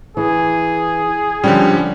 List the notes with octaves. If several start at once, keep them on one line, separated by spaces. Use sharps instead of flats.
E3 G#4
D3 F3 G3 C#4